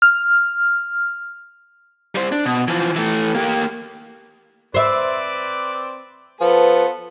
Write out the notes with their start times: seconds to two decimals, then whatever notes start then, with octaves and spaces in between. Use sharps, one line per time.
0.02 F6
2.15 G3 C5
2.32 D4
2.46 B2
2.68 E3 F3
2.96 E3 A3
3.35 A#3 G4
4.74 C4 B4 C5 D5 E5
6.41 F3 B3 A4 B4